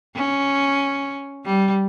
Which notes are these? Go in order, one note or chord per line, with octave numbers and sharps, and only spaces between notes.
C#4
G3